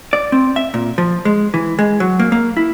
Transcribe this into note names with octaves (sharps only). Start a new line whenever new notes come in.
D5
C4
E5
A#2
F3
G#3
E3
G#3
F#3
A#3
A#3
E4